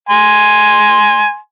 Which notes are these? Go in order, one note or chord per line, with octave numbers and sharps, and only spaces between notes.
G#5 C6